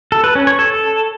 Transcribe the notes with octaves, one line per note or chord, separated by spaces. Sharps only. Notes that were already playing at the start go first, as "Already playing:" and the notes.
A4
B4
C#4
C#5
A4